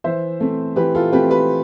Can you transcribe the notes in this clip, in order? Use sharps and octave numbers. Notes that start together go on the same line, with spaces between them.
E3 C5 E5
A3 C4
E3 G4 B4
F4 A4
A3 C4 G4 B4
G4 B4